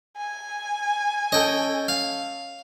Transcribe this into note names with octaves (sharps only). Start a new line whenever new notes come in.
G#5
C#4 A4 D#5 G5
F5